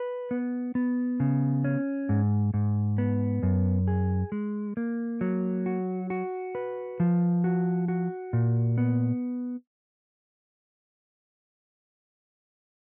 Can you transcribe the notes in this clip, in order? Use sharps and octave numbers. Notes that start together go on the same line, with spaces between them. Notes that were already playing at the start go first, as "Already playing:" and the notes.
Already playing: B4
B3
B3
C#3
C#4
G#2
G#2
B3
F#2
G#4
G#3
A#3
F#3
F#4
F#4
B4
F3
F#4
F#4
A#2
B3